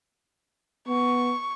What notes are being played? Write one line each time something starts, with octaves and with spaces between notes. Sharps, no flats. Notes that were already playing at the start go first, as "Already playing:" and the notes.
B3 C#6